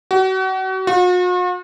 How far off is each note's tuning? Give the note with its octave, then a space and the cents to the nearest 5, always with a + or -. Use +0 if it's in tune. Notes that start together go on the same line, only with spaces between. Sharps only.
F#4 +35
F#4 -45